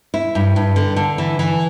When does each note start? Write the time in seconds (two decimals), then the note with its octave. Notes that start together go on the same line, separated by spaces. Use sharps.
0.14 E4
0.35 G2
0.56 G2
0.76 D3
0.96 D3
1.18 E3
1.39 E3